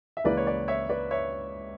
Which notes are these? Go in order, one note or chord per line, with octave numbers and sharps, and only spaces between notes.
E5
C#2 C#3 E3 A#3 B4 D5
C#5
B4 D5
C#5 E5
B4 D5
C#5 E5